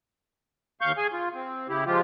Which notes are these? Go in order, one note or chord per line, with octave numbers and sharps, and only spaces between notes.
D#2 F5 C#6 G6
G#4 G#5
F4
C4
C#3 E4 G4
F3 G#3 F4 G4